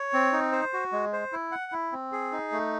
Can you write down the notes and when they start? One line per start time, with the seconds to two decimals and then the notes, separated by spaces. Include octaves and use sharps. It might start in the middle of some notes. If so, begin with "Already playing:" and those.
Already playing: C#5
0.13 C4
0.33 D#4
0.52 C5
0.73 F#4
0.92 G#3
1.13 C5
1.33 E4
1.52 F#5
1.72 E4
1.92 C4
2.12 G#4
2.32 D#4
2.52 A3